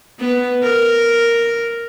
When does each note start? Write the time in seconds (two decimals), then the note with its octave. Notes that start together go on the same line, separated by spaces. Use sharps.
0.19 B3
0.63 A#4